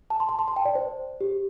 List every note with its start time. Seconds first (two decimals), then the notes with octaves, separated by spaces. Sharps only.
0.10 A5
0.20 C6
0.29 A5
0.39 C6
0.48 A5
0.56 G5
0.65 D5
0.75 C5
1.21 G4